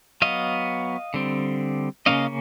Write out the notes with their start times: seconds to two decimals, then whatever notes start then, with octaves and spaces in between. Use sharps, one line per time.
0.22 F#3 B3 D#5 F5
1.14 D3 G3 C4
2.06 C#3 F3 A#3 C#4 D#5 F5